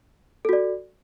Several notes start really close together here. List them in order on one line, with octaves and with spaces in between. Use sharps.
A4 F#4 D5